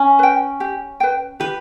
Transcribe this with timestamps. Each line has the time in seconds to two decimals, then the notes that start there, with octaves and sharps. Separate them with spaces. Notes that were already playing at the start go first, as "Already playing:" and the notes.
Already playing: C#4
0.19 B4 G5
0.60 G4
1.00 B4 G5
1.40 G4 B4